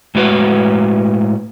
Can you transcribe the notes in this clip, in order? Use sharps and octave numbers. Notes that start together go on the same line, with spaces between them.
A2 G#3 F#4 B4